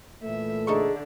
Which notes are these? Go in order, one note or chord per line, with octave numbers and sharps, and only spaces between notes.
A#2 E3 A3 E5
D3 D#4 G#4 A4 C#6